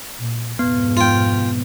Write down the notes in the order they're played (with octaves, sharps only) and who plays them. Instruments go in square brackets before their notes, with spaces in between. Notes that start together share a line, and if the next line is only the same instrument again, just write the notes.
[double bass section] A#2
[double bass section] F2 G#2 B2 [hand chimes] B3
[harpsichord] F4 G5